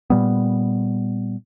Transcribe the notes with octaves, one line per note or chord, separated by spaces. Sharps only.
A#2 G3 B3